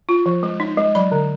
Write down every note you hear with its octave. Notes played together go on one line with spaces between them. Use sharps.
F4
F3
G#3
D#4
G#3
F#3 B5
D3